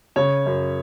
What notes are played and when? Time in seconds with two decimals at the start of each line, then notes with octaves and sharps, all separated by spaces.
0.16 C#3 C#5
0.46 F#2